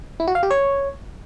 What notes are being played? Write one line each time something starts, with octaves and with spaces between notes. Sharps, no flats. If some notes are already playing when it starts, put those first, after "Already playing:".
E4
F#4
F5
G4
C#5